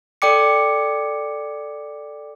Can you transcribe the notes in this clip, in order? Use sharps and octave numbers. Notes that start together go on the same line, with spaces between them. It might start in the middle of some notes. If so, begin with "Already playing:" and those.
A4 D5 G5 D6 C#7